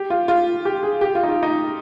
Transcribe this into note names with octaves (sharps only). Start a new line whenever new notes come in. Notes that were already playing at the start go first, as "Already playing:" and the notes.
Already playing: G4
F4
F4
G4
G#4
G4
F4
D#4
F4
D#4